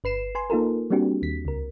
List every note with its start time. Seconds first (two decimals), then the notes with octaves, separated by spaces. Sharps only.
0.04 G1 B4 C7 E7
0.35 B4 G#5 C6
0.50 A#3 D#4 F4 A4 A#4
0.90 G3 A#3 C4 D4 F#4 G4
1.22 D#2 B6
1.45 C#2 A#4